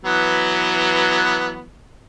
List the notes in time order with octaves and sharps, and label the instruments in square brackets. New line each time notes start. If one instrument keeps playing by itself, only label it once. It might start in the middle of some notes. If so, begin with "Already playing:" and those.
[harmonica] E3 F#3 B3